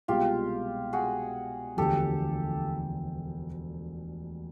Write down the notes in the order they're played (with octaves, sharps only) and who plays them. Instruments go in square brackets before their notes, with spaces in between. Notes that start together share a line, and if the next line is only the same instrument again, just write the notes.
[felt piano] C2 B2 G#3 [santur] F4 G4
[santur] F#4 G#4
[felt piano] E1 D2 D3 F3 [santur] G4 A4